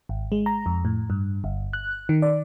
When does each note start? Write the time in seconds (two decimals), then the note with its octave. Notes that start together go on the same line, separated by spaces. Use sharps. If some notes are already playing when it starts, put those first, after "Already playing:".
0.09 G#1
0.32 G#3
0.46 A#5
0.66 F2
0.85 A2
1.10 G2
1.44 G1
1.73 F#6
2.09 D#3
2.22 D5